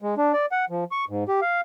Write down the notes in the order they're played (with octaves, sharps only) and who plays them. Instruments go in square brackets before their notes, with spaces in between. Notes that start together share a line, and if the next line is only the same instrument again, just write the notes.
[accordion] G#3
D4
D5
F#5
F3
C#6
G#2
G4
F5